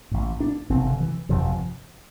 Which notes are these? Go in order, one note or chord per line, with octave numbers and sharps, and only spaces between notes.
A1 A2
D4
G1 F2 C3 C4
D3
E3
G1 F2 C3 F3
F3